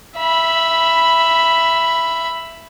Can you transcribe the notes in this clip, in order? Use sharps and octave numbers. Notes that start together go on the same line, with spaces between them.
E5 B5